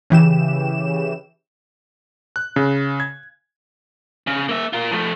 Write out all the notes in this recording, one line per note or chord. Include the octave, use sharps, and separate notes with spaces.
C#3 E3 G4 E7
F#6
C#3
G#6
C#3
A#3 E5
F4 A#4
F3 A3